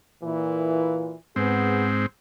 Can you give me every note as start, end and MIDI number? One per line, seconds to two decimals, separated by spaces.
0.24 1.14 46
0.24 1.14 52
1.36 2.06 44
1.36 1.87 59
1.36 2.06 60
1.36 1.87 68